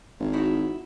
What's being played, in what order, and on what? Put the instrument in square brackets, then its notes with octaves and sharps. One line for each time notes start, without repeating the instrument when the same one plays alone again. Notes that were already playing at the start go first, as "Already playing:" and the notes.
[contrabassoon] G#1
[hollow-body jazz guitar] D#4 E4 F#4